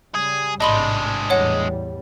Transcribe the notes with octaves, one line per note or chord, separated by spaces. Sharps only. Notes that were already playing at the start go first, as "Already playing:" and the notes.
C#3 G3 G#4
A1 G#2 C3 G#3 D4 D#5 B5 C6
E2 A2 G3 C#5 F#5